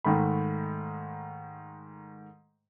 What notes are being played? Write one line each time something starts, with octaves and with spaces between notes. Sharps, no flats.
G#2 D#3 A3 B5